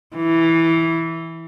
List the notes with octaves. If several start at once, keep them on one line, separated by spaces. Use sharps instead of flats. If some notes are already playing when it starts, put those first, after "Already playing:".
E3